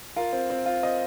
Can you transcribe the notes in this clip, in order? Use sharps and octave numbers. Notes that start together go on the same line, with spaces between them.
F4 A#4
C4
C4
F4
C4 D#5